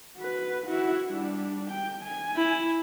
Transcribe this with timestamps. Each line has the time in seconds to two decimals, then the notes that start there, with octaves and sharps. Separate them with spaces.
0.17 F#4 B4
0.66 E4 F#4
1.09 G3 D4
1.71 G5
2.03 G#5
2.36 E4